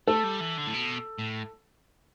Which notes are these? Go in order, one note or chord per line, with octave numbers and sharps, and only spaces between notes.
A3 A4
G3
E3
D3
A2
B2
A2